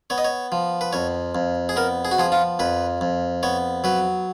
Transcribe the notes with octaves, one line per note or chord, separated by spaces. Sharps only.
B3 C#5
D#5
C#5
F3
B4
F2 C#5
F2
G#4
B3 A#4
G#4
F#4
F3 G#4
F4
F2 B4
F2
B3 C#5
F#3 B4